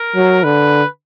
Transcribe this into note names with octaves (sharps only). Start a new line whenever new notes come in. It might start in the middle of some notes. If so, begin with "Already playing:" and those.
Already playing: A#4
F#3
D3 B4